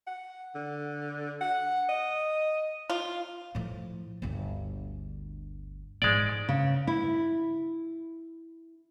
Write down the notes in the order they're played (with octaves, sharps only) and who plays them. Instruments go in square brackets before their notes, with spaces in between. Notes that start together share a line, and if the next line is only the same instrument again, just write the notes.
[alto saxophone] F#5
D3
F#5
D#5
[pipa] F4
[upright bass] A2 F3
G1 D2
[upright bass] G#2 F3 [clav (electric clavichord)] G#3 D5
[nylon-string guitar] C#3
E4